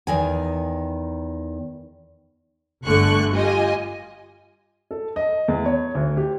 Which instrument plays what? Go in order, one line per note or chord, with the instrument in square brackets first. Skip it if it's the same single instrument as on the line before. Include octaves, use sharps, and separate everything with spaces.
[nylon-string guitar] E2 D#3 G#5
[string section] G1 D3 A3 C#6 F#6
F4 G4 D#5 G#5
[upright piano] A4
D#5
E2
C#5
D2
G4